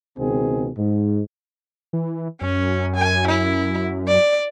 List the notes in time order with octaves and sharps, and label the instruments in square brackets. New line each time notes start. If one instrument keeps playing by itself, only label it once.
[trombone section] C#2 B2 D#3 C4 G#4
G#2
[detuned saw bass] E3
[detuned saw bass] F#2 [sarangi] C#4
[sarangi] G#5
E4
D5